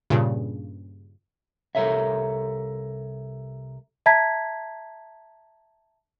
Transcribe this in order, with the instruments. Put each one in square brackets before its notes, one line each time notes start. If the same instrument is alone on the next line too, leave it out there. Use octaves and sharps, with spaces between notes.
[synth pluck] G2 A#2 C#3
[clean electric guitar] C2 C#3 A4 A#4 C#5 E5
[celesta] E5 A5 A#5 G#6 B6